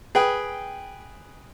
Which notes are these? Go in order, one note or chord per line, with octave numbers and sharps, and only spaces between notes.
G#4 B4 G5